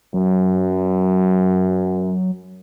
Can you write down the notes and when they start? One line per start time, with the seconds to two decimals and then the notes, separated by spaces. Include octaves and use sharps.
0.14 F#2 F#3